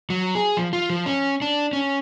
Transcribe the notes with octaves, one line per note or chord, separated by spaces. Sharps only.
F#3
G#4
F3
F4
F3
C#4
D4
C#4